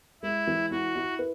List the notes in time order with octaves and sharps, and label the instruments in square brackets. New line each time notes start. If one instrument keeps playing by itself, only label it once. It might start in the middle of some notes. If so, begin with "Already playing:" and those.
[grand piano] G#3 [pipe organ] E4
[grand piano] E3
[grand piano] E4 [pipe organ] F#4
[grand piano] E4
B4